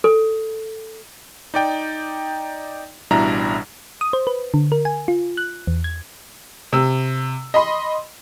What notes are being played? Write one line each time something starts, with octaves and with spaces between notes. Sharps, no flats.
A4
D#4 D5 G5
A1 B2 G3 D4 E4 A#5
D#6
C5
B4
D3
A#4
G#5
F4
F#6
E2
G#6
C3 E6
D#5 B5 C6